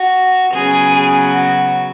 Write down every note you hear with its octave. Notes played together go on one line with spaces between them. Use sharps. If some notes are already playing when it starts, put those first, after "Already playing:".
Already playing: F#4
C#3 F#3 B3 G#4
G#4
F#4